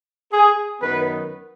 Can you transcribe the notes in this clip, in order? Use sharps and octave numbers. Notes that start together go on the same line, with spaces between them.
G#4
F#2 D#3 B3 B4